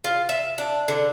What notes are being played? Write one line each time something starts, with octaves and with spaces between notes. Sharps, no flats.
F4
E5
D4
D3